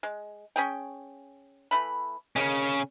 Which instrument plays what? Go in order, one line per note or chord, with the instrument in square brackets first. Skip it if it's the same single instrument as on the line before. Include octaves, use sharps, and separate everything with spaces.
[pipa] G#3
C#4 G#4 G5
E3 A3 B5
[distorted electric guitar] C#3 C#4 [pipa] A#3 D#5